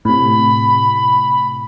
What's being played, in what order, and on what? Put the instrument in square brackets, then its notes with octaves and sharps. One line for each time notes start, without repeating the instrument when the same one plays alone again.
[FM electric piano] A2 C3 [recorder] B5